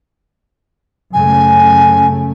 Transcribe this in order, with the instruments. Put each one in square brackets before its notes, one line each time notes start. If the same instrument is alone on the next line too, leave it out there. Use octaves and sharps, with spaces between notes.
[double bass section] F#2 C#3 A3 [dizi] G#5